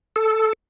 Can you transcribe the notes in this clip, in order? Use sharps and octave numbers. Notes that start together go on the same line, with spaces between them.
A4